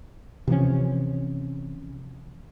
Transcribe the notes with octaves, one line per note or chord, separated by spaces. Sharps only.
C3 E3 F3 C#4